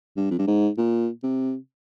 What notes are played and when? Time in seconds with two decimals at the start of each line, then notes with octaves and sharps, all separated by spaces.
0.17 G2
0.31 F2
0.39 G2
0.48 G#2
0.78 A#2
1.23 C3